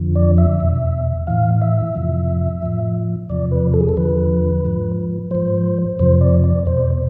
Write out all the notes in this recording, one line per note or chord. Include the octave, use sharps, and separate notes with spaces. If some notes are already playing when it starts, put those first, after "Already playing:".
Already playing: F2 D3 F3
D5
E5
E2 B2
A2 E3 F5
E5
F2 C3 F3
A2 F3
E2 C3 F3 D5
B4
A4
G#4
A4
E2 D3 F3 B4
G#2 F3
G#2 F3 C5
F2 C3 F3 C5
D5
D5
E2 B2 C5